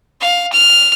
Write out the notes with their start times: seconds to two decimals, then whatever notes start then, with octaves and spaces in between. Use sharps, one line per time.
0.21 F5
0.53 F6